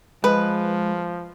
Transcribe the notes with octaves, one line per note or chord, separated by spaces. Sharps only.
F3 G#3 B4